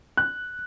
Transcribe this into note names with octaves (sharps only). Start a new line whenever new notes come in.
F#6